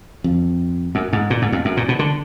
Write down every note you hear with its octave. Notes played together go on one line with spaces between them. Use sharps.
F2
F#2
G#2
A#2
G#2
F2
F#2
A#2
B2
D3